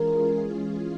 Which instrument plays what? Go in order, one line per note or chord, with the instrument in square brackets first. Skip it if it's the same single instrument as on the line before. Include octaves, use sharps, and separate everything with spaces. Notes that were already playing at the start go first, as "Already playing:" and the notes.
Already playing: [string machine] E3 G#3 C#4 F4 G#4 [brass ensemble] A#4